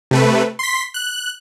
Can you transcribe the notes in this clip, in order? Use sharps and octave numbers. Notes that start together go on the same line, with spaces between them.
C3 A3 B4
C6 B6
F#6